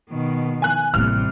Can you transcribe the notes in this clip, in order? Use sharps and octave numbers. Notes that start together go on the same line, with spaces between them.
B2 D#3
G#5 F#6
A1 C3 G3 A#3 F6